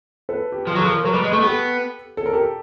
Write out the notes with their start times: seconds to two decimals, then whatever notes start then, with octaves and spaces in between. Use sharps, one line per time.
0.29 A4 B4
0.52 G4
0.66 F3 G#4
0.75 F#3 A4
0.85 F3
0.92 A#4
1.04 F#3 A4 B4
1.14 G3
1.24 G#3
1.33 A3 G#4
1.42 B3 G4 A4
2.17 A4
2.26 A#4
2.33 G4 A4